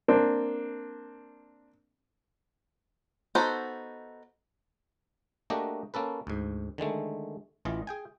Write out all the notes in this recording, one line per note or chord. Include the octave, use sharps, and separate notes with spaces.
A#3 C4 D4
B3 D#4 F#4 A4 C5
A3 A#3 D4 F#4 G4 D#5
A#3 C#4 A4 B4
D2 G#2
D3 D#3 G#3 A3
A1 E3 F4 D#5
G#4 G5 G#5